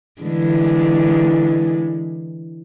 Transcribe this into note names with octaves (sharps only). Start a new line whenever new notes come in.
D3 E3 G#3